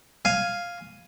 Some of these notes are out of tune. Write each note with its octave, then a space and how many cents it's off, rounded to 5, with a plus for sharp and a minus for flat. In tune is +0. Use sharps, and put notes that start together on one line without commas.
F5 +0 G#5 +0